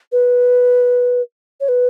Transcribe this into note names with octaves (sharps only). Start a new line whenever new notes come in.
B4
C#5
B4